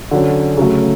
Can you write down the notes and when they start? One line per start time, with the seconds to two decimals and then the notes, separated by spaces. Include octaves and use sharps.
0.11 D3 F#3 C#4
0.57 C#3 F#3 A3